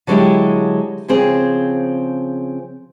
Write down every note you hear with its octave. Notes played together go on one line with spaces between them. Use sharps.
D3 F#3 G#3 D4 E4 G4
C#3 F3 C4 G#4